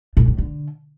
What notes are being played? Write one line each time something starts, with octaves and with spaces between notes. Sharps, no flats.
A2
A2
D3